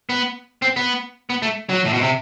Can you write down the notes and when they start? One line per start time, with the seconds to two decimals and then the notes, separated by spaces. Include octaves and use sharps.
0.09 B3
0.62 C4
0.76 B3
1.30 B3
1.42 A3
1.69 F#3
1.85 A2
1.93 B2
2.01 C3